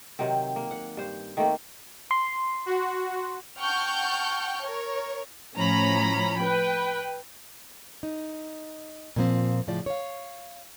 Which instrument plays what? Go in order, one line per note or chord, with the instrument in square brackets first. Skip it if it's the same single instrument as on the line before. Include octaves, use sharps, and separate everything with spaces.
[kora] C3 D#3 F#3 C4
A#3
F#5
G2 C5
D#3 A3 A#3 C4
[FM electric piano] C6
[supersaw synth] F#4
[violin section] F#5 G5 A5 C#6 F6 G6
A#4 C#5
[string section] A2 F3 C#4 A#5 B5
B4 G5
[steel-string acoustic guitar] D#4
A#2 F3 C4
A2 C#3 F3 D5
C#5 F5